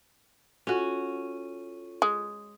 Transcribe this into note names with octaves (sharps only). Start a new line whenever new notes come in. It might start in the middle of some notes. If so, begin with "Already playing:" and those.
C#4 F4 F#4 A4 D#7
G#3